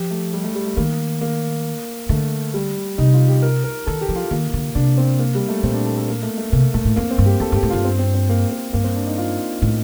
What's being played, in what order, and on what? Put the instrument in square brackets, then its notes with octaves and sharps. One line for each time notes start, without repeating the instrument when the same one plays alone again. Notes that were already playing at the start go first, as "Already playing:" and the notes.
Already playing: [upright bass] F3 [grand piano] G4
[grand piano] A3
G3
A3
G3
A3
[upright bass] D#3 [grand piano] A#3
[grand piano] A#3
[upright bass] D3 [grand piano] A3
[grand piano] G3
[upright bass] C3 [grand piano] D#4
[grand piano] F4
G4
A#4
A#4
[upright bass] D#3 [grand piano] A4
[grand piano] G4
[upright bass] F3
[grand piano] F4
[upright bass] D#3 [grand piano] A#3
[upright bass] D3
[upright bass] C3 [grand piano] D4
[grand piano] C4
A#3
G3
A3
[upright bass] A#2 [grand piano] C4
[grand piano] D4
A4
A4
A#3
A3
A3
[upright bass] C3 [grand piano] A#3
[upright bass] A#2 [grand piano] A3
[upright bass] A2
[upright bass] F2 [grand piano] A#3
[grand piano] C4
[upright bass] G2
[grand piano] G4
[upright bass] F2 [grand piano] A4
[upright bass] G2
[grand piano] G4
[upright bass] A2
[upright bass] G2 [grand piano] F4
[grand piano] C4
C4
C4
A#3
A#3
[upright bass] G2 [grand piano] A#3
[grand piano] C4
D4
D#4
F4
[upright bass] A2